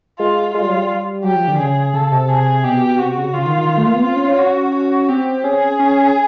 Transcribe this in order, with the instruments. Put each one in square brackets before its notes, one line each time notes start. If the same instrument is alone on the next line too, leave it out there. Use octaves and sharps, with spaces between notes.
[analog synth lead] G#3 [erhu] F4
[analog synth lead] G#3 [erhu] F4
[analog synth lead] G3
F#3
G3
[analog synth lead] F#3 [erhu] G4
[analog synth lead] F3
D3
[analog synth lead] C#3 [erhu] G#4
[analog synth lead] C#3 [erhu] A4
[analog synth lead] C3
[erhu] G#4
[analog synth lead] B2 [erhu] G4
[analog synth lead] C3 [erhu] F#4
[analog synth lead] C#3
[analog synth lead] C#3 [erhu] F4
[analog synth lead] D#3
D#3
D#3
A3
A#3
B3
[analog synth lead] C4 [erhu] F4
[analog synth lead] C#4
C#4
[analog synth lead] C#4 [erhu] F#4
[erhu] F#4
[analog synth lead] C4 [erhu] G4
[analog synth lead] C#4 [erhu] G#4
[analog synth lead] C#4